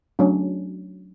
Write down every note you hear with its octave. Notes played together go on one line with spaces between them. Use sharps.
F#3 A3 C#4 D4